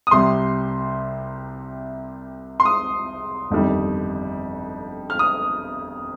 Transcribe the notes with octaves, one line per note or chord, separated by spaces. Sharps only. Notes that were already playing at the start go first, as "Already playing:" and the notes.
D#6
C2 C3 G3 C6
C6
D#6
G1 F2 D#3 G3
F6
D#6